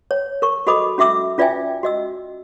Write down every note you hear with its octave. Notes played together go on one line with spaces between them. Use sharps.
C#5
A#4 C#6
F#4 A4 D#5 B5 D6 D#6
C#4 F#4 E5 D6 E6
C#4 F4 D5 E5 G5 G#5
F#4 D#5 E6